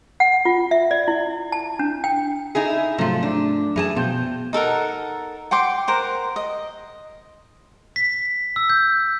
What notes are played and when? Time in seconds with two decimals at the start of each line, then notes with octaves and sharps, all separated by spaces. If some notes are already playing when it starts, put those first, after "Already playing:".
0.20 F#5
0.45 F4
0.71 E5
0.91 D5
1.08 E4
1.52 A5
1.79 D4
2.04 G5
2.55 D#4 E4 G#4
2.98 G#2 C3 F3 F#3 A3
3.23 D4
3.76 F#2 E3 G#4 A5
3.96 B2 F3 G5 G6
4.53 D#4 A4 A#4 F#5
5.51 F#5 G5 C6 D6
5.87 A#4 C5 F#5
6.36 D#5
7.96 B6
8.56 E6
8.70 G6